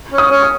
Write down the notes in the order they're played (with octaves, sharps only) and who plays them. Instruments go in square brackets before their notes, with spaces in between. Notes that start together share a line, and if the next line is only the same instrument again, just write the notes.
[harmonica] C#4
[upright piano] D#6
[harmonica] C#4
[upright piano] C#6